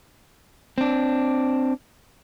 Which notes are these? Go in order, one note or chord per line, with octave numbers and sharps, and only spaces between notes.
C4 D4